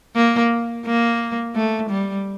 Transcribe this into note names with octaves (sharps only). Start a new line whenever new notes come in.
A#3
A#3
A3
G3